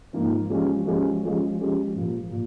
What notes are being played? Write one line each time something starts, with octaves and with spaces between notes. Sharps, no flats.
G#2 F3 A#3 F4
F3 G#3 C#4 G4
F3 G#3 C#4 G4
F3 G#3 C#4 G4
F3 G#3 C#4 G4
A#2 F3 A#3
A#2